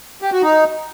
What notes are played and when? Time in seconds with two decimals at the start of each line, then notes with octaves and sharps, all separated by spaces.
0.22 G4
0.32 F#4
0.42 D#4